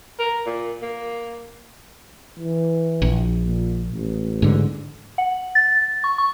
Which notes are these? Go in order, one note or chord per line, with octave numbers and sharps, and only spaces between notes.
A#4
A#2
A#3
E3
A#1
A#2
A1
G#2 D3
F#5
A6
C#6
C#6